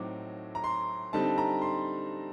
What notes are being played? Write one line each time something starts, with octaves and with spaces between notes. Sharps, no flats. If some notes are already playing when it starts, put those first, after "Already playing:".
Already playing: A2 F#3 C4 D#4 D6
A#5
C6
D3 G3 C4 D#4 A5
A#5
C6